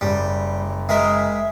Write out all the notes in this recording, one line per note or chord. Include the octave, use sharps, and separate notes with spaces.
F#1 G3
G#3 A#4 E5